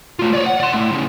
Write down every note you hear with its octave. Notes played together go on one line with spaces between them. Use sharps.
A3 F4
C#5 D5
F#5
D5 C6
A2 A3
A2 C#3